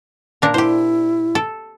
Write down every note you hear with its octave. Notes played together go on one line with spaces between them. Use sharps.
A#2 D4 A#4
E4 G4 C5
A4